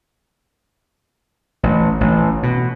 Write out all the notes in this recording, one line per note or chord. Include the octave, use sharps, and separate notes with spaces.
A1
A1
B2